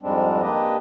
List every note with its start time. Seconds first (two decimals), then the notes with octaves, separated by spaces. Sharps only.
0.02 F2 G#2 G3 G#3 C4 D4
0.42 A#3 D4 G4 B4 D#5